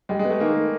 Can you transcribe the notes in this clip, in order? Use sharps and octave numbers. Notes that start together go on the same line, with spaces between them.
G3 G#3
G#3
B3
A3
D#3 A#3